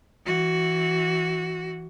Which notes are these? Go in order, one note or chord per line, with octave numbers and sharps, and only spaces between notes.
E3 F#4